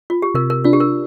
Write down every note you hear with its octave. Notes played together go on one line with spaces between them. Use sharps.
F4
G4
C3 A#4
A#4
D4 F4
G4
A#4